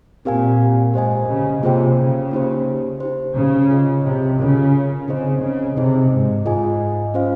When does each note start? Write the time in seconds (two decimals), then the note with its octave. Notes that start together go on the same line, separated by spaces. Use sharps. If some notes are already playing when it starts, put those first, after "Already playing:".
0.25 A#2 C4 G4 A#4 F5 G#5
0.94 G#2 G4 C5 D#5 G#5
1.29 C#3
1.63 C3 A#3 F4 G#4 C5 G5
1.97 C#3
2.31 A#3 D#4 G4 C5
3.00 D#4 G4 C5
3.36 C#3
3.70 F4 G#4 D#5
4.05 C3
4.39 C#3 F4 A#4 C#5
5.08 C#3 C4 D#4 G#4 C5 D#5
5.42 C#3
5.76 C3 C4 D#4 G#4 C5 D#5
6.11 G#2
6.46 G#2 F4 G#4 D#5 G#5
7.14 C#4 F4 C5 F5